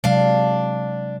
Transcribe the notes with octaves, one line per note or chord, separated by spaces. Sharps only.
C3 F#3 G#3 D4 F5